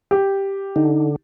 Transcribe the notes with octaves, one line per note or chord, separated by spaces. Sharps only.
G4
D3 D#4